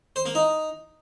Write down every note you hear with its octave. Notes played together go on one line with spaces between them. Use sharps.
C5
A#3
D#4